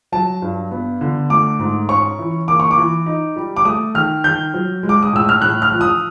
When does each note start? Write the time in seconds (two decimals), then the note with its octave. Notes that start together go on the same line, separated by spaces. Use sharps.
0.12 F#3 A5
0.42 G2
0.71 B3
1.01 D3
1.30 A3 D6
1.59 G#2
1.89 C#4 C#6
2.19 E3
2.48 A#3 D6
2.60 C#6
2.71 D6
2.78 E3
3.06 D#4
3.36 G3
3.57 D6
3.65 A3 D#6
3.95 D#3 F6
4.24 D#3 G6
4.54 F#3
4.83 G#3
4.89 D6
5.03 D#6
5.13 A2 E6
5.29 F6
5.42 A2 F#6
5.62 F6
5.71 F3
5.81 D#6